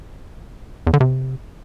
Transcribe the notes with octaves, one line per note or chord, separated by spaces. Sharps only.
E2
D3
C3